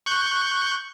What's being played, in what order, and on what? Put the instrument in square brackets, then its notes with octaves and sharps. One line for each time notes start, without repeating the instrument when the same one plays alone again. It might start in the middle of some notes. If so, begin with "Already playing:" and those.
[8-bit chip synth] C#6 F#6 G6